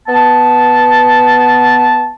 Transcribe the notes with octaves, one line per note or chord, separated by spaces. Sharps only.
B3 A5